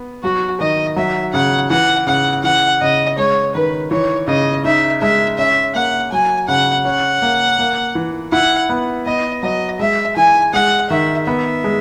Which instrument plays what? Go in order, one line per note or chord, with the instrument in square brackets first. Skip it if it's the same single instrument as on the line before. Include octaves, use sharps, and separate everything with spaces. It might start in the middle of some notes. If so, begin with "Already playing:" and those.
Already playing: [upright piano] B3
[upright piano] F#3 [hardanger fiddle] F#4
[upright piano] D#3 [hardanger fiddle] D#5
[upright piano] F#3 [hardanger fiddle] E5
[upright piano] C#3 [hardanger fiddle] F#5
[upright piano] E3 [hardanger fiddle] F#5
[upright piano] C#3 [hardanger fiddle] F#5
[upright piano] E3 [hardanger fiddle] F#5
[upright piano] C#3 [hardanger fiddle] D#5
[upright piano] G#3 [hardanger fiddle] C#5
[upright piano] D#3 [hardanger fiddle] B4
[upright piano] E3 [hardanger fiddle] C#5
[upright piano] C#3 [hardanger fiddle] D#5
[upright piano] D#4 [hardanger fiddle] E5
[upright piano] G#3 [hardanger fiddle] E5
[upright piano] C#4 [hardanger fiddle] E5
[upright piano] A#3 [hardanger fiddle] F#5
[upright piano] F#3 [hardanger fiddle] G#5
[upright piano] C#3 [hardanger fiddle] F#5
[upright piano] C#4 [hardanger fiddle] F#5
[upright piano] A#3
A#3
E3
[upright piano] E4 [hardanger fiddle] F#5
[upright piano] B3
[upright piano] B3 [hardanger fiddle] D#5
[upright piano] F#3 [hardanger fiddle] D#5
[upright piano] G#3 [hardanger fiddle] E5
[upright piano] E3 [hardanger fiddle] G#5
[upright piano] G#3 [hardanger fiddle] F#5
[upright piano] D#3 [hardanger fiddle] E5
[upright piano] B3 [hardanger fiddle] E5
[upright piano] G#3